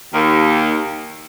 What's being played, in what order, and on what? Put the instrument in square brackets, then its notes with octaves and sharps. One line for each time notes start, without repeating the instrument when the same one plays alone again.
[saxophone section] D#2